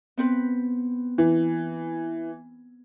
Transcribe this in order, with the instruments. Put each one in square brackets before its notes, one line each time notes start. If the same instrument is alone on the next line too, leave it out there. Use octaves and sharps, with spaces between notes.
[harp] B3 C4 B4
[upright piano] E3